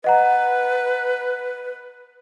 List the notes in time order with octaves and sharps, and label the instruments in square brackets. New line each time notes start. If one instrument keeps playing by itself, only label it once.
[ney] B4 [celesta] D#5 F#5 A#5